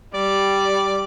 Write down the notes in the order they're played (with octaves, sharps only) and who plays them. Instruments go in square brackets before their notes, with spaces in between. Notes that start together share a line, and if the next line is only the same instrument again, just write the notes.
[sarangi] G3 [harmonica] D5